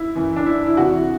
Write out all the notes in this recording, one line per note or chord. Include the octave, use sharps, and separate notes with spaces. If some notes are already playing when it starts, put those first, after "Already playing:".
Already playing: E4
F#2 E3
D4
E4
E4
E2 C3 E3 F#4